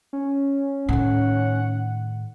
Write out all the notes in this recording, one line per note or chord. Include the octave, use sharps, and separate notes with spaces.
C#4
A2 D#3 F#5